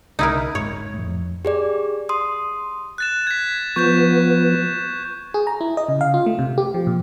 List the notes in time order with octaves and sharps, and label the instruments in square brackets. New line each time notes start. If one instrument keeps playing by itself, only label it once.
[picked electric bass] C2 [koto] D#4 E4 A#4
[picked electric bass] F#1 G#2 [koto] C#5
[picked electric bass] F2 A2
[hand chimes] G4 G#4 D5
C6 D#6
[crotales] F#6 A6 E7
G#6 B6
[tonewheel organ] F3 B3 [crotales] C#6 G6 E7
[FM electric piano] G#4
A#5
E4
D#5
C#3
F5
F4
A3
C3
G4
F3
A#2